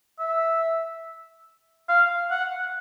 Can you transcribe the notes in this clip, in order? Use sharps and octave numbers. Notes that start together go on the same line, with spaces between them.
E5
F5
F#5